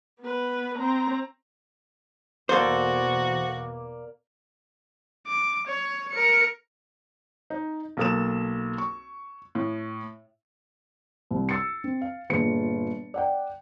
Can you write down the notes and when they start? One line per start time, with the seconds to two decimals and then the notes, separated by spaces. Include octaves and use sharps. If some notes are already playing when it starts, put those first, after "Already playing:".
0.21 B3 B4
0.78 C4 A#5
2.49 E2 B2 E3 A#3 F#4 A4 C5 D5
5.27 D6
5.67 C#5
6.11 A#4 C#7
7.50 D#4
7.97 B1 A#3 A4 D#6 E7
8.78 C#6
9.55 A2
11.31 C2
11.49 E6 A6 C7 C#7
11.84 C4
12.02 F5
12.30 G1 A#2 G#4 C#7
13.14 D5 F#5 G5